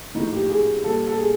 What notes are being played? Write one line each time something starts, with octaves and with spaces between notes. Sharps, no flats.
A2 F3 G#3 D#4
G4
G#4
A#2 G3 A4
A4
G#4